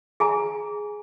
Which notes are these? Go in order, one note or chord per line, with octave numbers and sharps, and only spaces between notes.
G#4 G#5 A#5